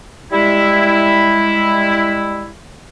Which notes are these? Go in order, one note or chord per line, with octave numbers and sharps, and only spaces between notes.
G3 G#3 E4